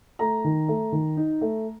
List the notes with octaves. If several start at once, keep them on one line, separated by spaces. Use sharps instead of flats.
A3 A#5
D#3
A3
D#3
D#4
A3